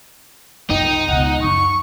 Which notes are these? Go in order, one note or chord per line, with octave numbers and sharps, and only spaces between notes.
B1 F2 D#4 G5
C#2 B2 F#5
F#2 F3 C#6